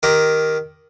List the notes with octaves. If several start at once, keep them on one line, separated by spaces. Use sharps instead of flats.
D#3 G4 A#5